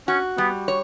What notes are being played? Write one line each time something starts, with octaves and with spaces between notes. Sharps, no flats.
C#4 F#4
G3 B3
C#5